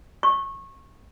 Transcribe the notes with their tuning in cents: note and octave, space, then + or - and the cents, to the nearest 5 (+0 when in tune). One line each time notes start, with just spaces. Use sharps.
C#6 -25